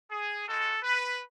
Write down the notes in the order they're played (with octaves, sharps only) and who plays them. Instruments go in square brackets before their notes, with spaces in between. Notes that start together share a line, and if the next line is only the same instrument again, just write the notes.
[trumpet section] G#4
G#3 D#4 F#4 A4
B4